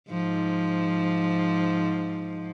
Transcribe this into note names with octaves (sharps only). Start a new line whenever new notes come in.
G#2 F3